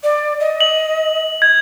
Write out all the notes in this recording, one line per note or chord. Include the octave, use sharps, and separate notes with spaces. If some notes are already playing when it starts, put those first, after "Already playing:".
D5
D#5
F#7
G#6